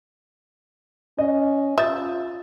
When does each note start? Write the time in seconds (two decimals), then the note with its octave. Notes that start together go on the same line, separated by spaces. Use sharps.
1.19 C#4 D#5
1.78 F4 E5 D#6 G6 A6